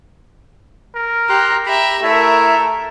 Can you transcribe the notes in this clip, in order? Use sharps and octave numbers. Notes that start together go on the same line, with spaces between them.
A#4
G4 A#5 C6 F#6
G4 E5 A#5 B5
A3 E4 A#4 E5 A5